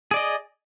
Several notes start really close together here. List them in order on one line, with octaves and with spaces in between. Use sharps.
G#4 D5 D#5